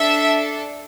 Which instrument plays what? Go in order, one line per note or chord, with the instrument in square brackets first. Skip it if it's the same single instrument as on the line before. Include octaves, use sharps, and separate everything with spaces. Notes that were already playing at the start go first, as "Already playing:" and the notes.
Already playing: [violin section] D4 A4 E5